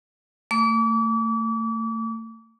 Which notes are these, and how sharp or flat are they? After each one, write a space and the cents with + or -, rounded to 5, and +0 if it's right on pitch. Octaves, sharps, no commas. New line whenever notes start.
A3 +35 D6 -35